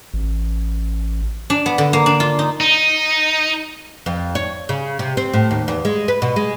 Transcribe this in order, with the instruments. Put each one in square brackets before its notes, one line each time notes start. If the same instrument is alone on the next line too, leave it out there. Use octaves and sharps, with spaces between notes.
[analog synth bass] A1
[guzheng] D4
B3
D3
A#3
D4
F4
D#4
[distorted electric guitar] D#4
[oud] F2
C#5
C#3
C3
C4
A2
D#2
E2
G#3
B4
B2
G#3